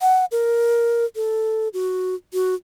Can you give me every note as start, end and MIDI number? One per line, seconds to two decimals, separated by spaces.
0.01 0.25 78
0.31 1.05 70
1.16 1.68 69
1.74 2.15 66
2.33 2.54 66